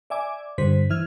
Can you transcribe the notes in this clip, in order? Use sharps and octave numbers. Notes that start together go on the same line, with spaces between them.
D5 E5 G#5 D6
G2 D3 G3 C5 B6
E3 E5 F6 G#6